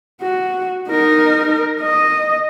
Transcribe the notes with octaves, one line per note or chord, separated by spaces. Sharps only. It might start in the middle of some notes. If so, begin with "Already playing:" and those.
F#4
D#4 A#4
D#5